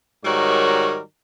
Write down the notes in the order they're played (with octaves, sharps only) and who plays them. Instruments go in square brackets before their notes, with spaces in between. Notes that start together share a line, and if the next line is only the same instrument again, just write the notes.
[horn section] G#2 D#3 G3 F#4 A#4 C#5